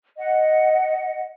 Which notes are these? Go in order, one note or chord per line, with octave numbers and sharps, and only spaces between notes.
D#5 F#5